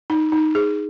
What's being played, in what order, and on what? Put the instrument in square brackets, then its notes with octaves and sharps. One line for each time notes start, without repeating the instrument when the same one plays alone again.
[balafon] D#4
D#4
G#4